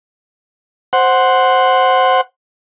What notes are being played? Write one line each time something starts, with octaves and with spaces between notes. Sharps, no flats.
C5 F#5